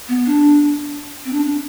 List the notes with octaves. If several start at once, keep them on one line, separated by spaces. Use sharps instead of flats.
B3
D4
C4
D4